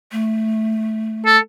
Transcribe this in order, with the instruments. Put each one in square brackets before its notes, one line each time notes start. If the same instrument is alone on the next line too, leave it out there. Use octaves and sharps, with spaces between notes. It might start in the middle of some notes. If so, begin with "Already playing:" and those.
[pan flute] A3
[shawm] A4